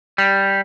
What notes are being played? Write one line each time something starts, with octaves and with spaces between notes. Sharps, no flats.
G3